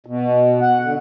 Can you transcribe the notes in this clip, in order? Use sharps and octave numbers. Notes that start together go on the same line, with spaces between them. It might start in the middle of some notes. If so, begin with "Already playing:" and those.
B2
F#5
D3